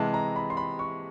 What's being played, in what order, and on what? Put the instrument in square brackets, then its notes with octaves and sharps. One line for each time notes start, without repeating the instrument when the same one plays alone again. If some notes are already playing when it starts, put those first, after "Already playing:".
Already playing: [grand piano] C3 E3 G#3 A5
A#5
B5
C6
B5
C#6